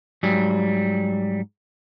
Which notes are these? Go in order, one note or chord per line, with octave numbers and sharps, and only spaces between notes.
G#2 F#3 G3